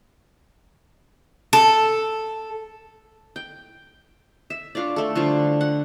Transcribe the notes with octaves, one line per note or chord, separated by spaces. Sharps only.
A4
G5
E5
D4 F4 C#5 D5
A3 A4
D3 F3 G3 F4
F#5